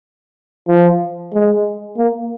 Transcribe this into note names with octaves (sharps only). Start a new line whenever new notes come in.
F3
G#3
A#3